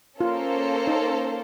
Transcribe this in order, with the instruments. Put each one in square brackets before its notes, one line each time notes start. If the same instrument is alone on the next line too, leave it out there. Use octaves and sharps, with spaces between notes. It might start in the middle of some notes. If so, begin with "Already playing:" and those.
[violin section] A#3 C#4 A4 C5 [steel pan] F4
[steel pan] D#4